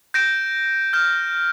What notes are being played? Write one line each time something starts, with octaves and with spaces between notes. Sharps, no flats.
G6 A#6 D7 E7
F6 G6